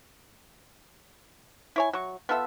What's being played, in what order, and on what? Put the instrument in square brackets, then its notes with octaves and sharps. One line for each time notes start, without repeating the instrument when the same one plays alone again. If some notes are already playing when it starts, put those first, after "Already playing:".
[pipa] E4 C#5 G#5
F#3 C#6
B3 F4 A4 E5